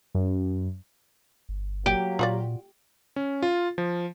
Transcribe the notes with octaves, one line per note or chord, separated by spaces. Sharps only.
F#2
G1
F#3 A#3 G4
A#2 F4 F#4 D5
C#4
F4
F3